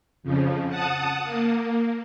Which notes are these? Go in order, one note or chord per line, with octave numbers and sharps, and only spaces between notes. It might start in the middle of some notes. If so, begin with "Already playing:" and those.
F2 C#3 F3
F#5 A5 D#6
A#3